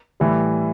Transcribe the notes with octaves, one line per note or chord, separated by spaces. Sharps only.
A2 E3 G3